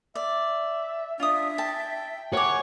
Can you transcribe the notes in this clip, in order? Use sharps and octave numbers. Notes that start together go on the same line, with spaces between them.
D5 E5
D4 F4 E5 D#6
G5 A5
A#4 C#5 F#5 G#5 D6